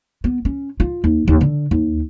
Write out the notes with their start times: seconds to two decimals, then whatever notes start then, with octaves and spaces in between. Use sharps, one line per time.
0.24 B3
0.45 C#4
0.80 F4
1.04 D#2
1.28 D#2
1.41 D3
1.71 D#2